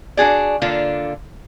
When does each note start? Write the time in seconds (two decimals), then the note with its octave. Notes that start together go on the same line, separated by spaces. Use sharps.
0.17 D4 F#4 G#4 D5
0.62 D3 A#3 D4 F4